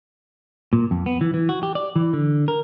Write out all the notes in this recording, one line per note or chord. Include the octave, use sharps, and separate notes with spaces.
A#2
F2
B3
E3
E3
F#4
G4
D5
E3
D3
A#4